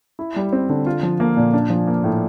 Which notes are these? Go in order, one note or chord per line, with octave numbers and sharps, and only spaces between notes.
E4
G3
C4
D3
F4
F3
A#3
A#2
D4
F3
A#3
A2